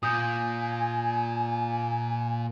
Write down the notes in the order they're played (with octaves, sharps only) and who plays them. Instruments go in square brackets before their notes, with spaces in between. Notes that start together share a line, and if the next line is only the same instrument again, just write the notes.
[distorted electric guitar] A#2 [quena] G#5 [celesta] D#6 G6